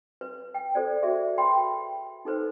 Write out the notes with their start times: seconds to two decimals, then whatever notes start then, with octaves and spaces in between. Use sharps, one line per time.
0.21 B4
0.54 G5
0.75 A4 C5 D5
1.03 F#4 G#4 D5 E5
1.38 B4 G5 B5 C6
2.25 D#4 A4 B4 C5